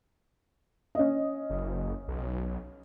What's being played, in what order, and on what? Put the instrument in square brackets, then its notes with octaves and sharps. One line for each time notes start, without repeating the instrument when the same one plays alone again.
[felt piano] C#4 D#5
[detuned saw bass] F#1
B1